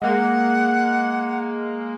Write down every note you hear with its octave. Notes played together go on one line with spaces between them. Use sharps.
G#3 A#3 F#5